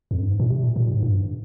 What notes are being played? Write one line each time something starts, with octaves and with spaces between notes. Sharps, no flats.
F2
G2
G#2
A#2
C3
A#2
A#2
G#2
G2